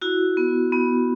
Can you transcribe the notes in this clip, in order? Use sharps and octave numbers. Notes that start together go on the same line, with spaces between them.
E4 F#4
B3
B3